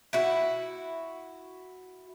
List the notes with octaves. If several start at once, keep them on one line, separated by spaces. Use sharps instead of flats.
E4 F#4